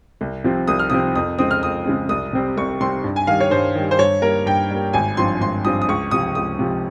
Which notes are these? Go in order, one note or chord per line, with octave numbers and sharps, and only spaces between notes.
C2
C3 F3 C4
C2 D#6
F6
C3 F3 C4 D#6
F2 D#6
C#3 G#3 C4 D#6
F6
F2 D#6
C#3 G#3 C4
C2 D#6
C3 G3 C4
C2 C#6
C3 G3 C4 C6
G2
G#5
D#3 G3 F5
C#5
G2 C5
D#3 G3
C5
G2 C#5
G3 A#3 A#4
G2 G5
G3 A#3
G#1 G#5
G2 F3 C4 C6
G#1 C6
G2 F3 C4 D#6
D#6
C#2 C#6
C3 F3 D#6
C#2 D#6
C3 F3